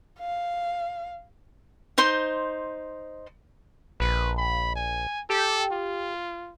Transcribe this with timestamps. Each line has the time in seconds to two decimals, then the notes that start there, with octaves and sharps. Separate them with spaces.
0.20 F5
1.98 D#4 C5 C6
4.00 A#1 B4
4.37 B5
4.75 G#5
5.30 G4 A4
5.72 F4